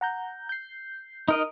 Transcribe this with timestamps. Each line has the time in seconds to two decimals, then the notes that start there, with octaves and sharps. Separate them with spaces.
0.01 F#5 A#5 G6
0.49 G6 C7
1.28 D#4 A#4 D#5